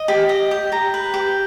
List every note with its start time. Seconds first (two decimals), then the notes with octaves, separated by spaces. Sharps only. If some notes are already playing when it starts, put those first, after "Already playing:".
Already playing: D#5
0.08 G4
0.29 D#5
0.51 G4
0.72 G4 A#5
0.94 B4
1.14 G4